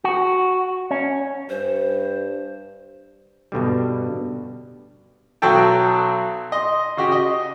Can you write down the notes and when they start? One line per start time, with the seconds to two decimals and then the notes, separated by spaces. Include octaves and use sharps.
0.04 F#4
0.91 C#4
1.49 G2 C5
3.52 G2 B2 D3 G3
5.42 B1 F#3 F#4 A4 G5 A5
6.52 D#5 C6
6.97 C#3 F#4 G4
7.12 D#5